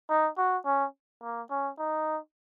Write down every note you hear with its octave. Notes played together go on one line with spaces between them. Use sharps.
D#4
F#4
C#4
A#3
C#4
D#4